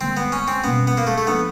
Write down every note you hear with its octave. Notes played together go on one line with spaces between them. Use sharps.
D3 G3 A#3 C4
B3
C#4
C4
B2 G3 A#3 B3 C#4
B3
A#3
A3
A3
F3 A#3 B3 D4